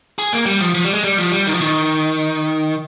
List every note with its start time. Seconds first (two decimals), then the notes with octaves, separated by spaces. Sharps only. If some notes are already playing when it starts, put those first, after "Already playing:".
0.19 G#4
0.33 A#3
0.46 G3
0.61 F3
0.75 F3
0.85 G3
0.94 G#3
1.04 G3
1.18 F3
1.32 G3
1.47 D#3
1.54 F3
1.61 D#3